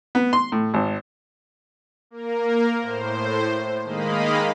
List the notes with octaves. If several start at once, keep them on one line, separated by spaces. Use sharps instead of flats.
B3
C6
A2
G#1
A#3 A#4
A2 C5
D#3 G#3 A#3 D#5 F5 B5